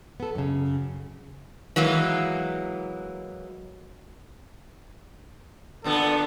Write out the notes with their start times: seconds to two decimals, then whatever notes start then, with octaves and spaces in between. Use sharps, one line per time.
0.20 B3 A4
0.35 F#2 C#3
1.76 E3 F#3 G#3 A#3
5.84 A#2 D3 B3 A4